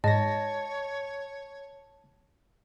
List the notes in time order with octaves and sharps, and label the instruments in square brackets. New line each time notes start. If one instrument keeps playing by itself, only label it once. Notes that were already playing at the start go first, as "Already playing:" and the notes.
[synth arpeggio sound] G#2 A#6 [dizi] C#5 [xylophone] D#5 [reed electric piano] A5